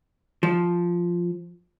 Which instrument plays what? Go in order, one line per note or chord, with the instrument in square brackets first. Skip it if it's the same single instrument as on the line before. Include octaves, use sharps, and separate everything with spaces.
[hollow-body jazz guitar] F3